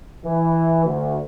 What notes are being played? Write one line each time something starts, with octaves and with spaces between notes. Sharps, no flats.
E3
D2